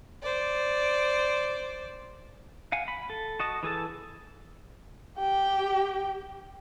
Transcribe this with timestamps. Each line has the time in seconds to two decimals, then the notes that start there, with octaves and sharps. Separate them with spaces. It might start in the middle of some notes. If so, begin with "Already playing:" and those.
0.22 C5 D5
2.72 F5 F#5 G#5
2.88 B5
3.10 A4
3.40 F#4 D#5 A5
3.63 E3 G#4 A4 A5
5.18 G4 G5